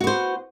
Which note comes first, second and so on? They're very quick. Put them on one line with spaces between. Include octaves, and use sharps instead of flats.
F#4 B3 C5